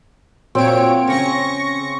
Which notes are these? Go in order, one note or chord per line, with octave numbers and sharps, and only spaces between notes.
A#2 A#3 C4 F#4 C#5 D7
C#3 C#4 C#6 A#6 C#7